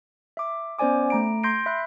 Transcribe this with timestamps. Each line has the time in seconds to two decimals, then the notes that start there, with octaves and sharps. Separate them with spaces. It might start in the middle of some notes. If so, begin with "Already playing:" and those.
0.37 E5 D6
0.79 B3 C#4 C5 D5 G#5 D6
1.10 A3 A#5 D7
1.44 C6 G6 A#6 C7 D7
1.66 E5 B5 F#6